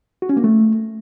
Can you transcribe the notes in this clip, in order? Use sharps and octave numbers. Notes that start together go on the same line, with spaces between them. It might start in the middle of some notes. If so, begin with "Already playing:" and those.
F#4
C#4
A#3
A3